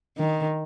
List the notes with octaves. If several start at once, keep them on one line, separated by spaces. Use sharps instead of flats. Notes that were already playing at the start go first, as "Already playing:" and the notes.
D#3